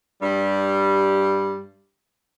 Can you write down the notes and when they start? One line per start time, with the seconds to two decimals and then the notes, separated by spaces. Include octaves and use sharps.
0.22 G2 G3